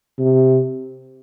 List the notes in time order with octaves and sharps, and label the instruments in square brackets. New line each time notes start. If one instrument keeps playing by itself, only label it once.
[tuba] C3